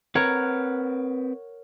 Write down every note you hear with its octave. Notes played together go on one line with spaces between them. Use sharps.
C4 A#4 B4 C#5 F#5